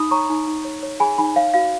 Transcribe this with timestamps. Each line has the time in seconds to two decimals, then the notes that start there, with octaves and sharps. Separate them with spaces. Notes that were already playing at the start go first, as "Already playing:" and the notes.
Already playing: D#4 B5 D#6
0.11 C#5 A#5 C#6
0.29 D#4
0.47 D#4
0.64 C#5
0.83 C#5
1.00 G#4 G#5 B5
1.18 D#4 G#5 B5
1.36 C#5 F5
1.54 F#4 F5